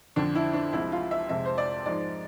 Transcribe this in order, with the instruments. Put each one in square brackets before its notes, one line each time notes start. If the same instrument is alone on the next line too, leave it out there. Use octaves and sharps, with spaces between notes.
[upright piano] F2 D3 F3 D4
E4
D4
C2 C3 F3 G#3 E4
F4
E5
F2 C3 G#3 E5
C5
D5
G#2 F3 G#3 D5